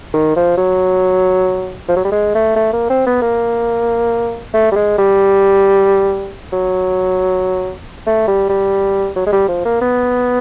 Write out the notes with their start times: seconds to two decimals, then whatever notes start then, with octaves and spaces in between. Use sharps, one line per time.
0.14 D#3
0.36 F3
0.58 F#3
1.88 F3
1.96 F#3
2.05 G3
2.12 G#3
2.35 A3
2.56 A3
2.73 A#3
2.90 C4
3.06 B3
3.22 A#3
4.54 A3
4.72 G3
4.76 G#3
4.98 G3
6.53 F#3
8.07 A3
8.27 G3
8.49 G3
9.16 F#3
9.27 G#3
9.33 G3
9.48 F3
9.65 A#3
9.81 B3